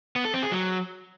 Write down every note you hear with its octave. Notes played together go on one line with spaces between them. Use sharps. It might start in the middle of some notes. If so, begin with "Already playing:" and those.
B3
A4
C4
G#4
F#3